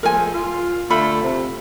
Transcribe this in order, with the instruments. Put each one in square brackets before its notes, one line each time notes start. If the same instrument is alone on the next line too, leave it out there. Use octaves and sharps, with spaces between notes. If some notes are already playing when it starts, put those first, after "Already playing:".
[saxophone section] F3 G#3 A3 [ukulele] A#4 G#5
[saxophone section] F4
[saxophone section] D3 A3 [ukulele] F4 B5
[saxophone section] C3